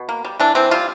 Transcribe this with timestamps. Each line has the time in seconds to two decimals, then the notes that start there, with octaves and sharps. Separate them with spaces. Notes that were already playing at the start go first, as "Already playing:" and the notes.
Already playing: B2
0.09 A#3
0.25 G3
0.40 E3 D4
0.55 E3 C4
0.71 G3 F4